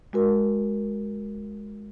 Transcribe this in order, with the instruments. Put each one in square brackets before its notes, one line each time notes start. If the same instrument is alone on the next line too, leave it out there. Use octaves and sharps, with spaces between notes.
[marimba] G#3 F#4 A#4